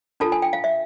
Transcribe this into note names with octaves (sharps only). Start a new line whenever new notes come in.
D4 F4 A4 A5
G#5
G5
F5
E5